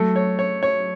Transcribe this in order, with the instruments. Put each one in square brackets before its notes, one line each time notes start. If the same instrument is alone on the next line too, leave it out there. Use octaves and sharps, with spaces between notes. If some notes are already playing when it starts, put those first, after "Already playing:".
Already playing: [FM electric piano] F#3 [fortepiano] A3
[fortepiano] C#5
C#5
C#5